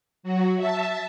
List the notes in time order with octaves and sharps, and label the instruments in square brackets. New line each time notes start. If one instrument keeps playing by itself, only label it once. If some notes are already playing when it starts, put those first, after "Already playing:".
[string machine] F#3 F#4
E5 A5